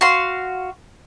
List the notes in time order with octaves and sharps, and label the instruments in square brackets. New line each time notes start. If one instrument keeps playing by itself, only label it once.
[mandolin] F#4 F5 C6